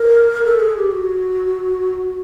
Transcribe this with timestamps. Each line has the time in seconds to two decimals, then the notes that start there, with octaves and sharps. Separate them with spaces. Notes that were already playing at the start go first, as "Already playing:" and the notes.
Already playing: A#4
0.45 A4
0.60 G#4
0.76 G4
0.92 F#4